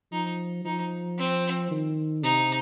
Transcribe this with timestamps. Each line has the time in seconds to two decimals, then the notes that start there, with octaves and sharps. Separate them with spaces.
0.13 F3 D#4
0.65 F3 D#4
1.18 C4
1.71 D#3
2.23 C3 D#4